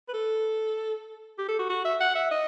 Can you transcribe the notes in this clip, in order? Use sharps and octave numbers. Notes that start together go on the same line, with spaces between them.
B4
A4
G4
A4
F#4
F#4
E5
F#5
E5
D#5